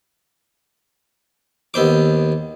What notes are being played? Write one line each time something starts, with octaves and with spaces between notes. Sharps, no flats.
D#2 B3 C5 D6